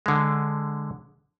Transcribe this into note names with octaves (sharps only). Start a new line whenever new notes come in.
D3 G#3